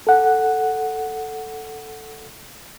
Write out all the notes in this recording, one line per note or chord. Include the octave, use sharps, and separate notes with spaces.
A4 F#5